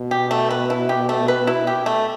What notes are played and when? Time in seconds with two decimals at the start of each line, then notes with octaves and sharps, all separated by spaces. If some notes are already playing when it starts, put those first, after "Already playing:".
Already playing: B2
0.11 G4
0.31 A3
0.51 B4
0.70 E4
0.89 G4
1.09 A3
1.28 B4
1.47 E4
1.67 G4
1.86 A3